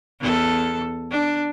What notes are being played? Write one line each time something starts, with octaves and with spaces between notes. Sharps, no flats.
E2 A4
D4